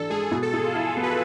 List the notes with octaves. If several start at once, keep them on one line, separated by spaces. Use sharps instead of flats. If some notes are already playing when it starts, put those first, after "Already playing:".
Already playing: E3 D4 A4
G#3 G#4
B2 G#4
A4
B2 G#4
F4
E4 G#4
A4
B3
B4